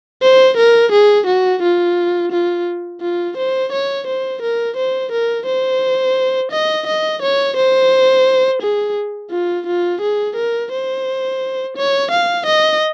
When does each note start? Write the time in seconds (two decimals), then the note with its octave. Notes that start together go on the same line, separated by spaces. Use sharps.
0.22 C5
0.57 A#4
0.92 G#4
1.27 F#4
1.62 F4
2.32 F4
3.01 F4
3.37 C5
3.72 C#5
4.07 C5
4.42 A#4
4.76 C5
5.12 A#4
5.46 C5
6.51 D#5
6.87 D#5
7.22 C#5
7.56 C5
8.62 G#4
9.31 F4
9.66 F4
10.01 G#4
10.36 A#4
10.72 C5
11.77 C#5
12.11 F5
12.46 D#5